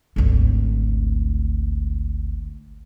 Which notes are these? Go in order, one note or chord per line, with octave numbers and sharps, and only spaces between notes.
G#1 D2